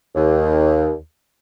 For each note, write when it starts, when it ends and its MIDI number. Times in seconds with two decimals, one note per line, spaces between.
0.16 0.94 39